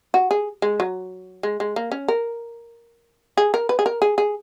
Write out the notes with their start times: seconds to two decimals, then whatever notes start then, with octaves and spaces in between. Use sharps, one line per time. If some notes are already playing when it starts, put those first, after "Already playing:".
0.14 F#4
0.31 G#4
0.62 G#3
0.80 F#3
1.43 G#3
1.60 G#3
1.76 A#3
1.92 C#4
2.08 A#4
3.37 G#4
3.54 A#4
3.69 B4
3.79 G#4
3.86 A#4
4.02 G#4
4.18 G#4